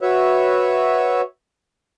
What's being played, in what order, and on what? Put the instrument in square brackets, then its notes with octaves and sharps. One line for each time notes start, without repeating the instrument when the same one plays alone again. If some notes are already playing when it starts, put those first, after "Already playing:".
[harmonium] F#4 B4 C#5 E5